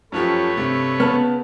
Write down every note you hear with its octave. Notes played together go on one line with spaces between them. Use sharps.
F#2 F3 A3 G4 B4 C#5
G2 C3
C#3 B3 A5 F6